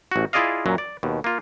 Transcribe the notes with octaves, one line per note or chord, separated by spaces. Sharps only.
A1 F#4
E4 F4 G#4 D5 D#5 F5
F#2 A#2 F#3
D5
D#2 B2
A#3 F4